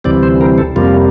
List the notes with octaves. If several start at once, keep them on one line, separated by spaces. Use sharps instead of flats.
D2 C3 E3 G3 C4 D5
C5
A#4
A4
F2 C3 G3 A#3 F4